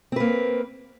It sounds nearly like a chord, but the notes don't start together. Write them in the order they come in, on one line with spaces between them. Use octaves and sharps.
C4 B4 A#3